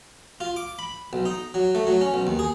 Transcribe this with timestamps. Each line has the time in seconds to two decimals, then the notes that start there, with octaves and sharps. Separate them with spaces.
0.40 F4
0.56 D6
0.79 B5
1.13 B1
1.26 D#4
1.54 F#3
1.75 A3
1.87 F#3
2.01 C#4
2.14 B1
2.27 D#2
2.39 G#4